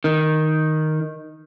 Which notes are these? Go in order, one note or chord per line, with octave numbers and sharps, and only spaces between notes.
D#3